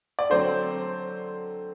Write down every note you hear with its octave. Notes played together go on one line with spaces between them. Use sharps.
D5
D3 F#3 C4 C5